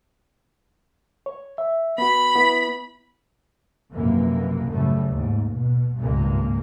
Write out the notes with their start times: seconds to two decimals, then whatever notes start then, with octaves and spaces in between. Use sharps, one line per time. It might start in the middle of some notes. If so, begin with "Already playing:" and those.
1.26 C#5
1.58 E5
1.98 B3 F#4 B5
2.35 B3 E4
3.93 A#1 F#2 C3 E3 A#3
4.68 A1 F#2 A2 C#3 G3 A3
5.10 D#2 G#2
5.50 B2
5.97 G#1 C#2 G2 A#2 G#3 A#3